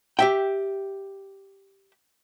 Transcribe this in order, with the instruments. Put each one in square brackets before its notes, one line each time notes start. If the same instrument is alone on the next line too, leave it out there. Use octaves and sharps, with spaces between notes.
[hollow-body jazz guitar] G4 E5 G5